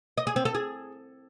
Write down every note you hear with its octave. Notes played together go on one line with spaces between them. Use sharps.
D#5
G#4
C4
A4
G#4